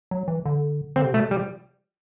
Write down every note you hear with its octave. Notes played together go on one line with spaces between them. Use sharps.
F#3
E3
D3
D3 C4
C3
B2 A3
C3
G3